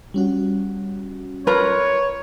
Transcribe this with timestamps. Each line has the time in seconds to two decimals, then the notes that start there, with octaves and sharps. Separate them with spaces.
0.14 G3 C#4 F#4
1.47 F4 A#4 B4 C#5 A#5